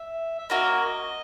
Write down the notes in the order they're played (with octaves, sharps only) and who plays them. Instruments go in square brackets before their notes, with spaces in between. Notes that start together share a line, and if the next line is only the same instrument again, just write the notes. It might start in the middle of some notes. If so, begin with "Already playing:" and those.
Already playing: [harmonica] E5
E5
[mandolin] A#3 C#4 F#4 A#4 [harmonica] D#5